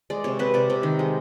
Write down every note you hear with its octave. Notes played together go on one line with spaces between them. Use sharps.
G#3 D5
C3 C#5
C3 B4
C3 D5
C3
D#3
G#3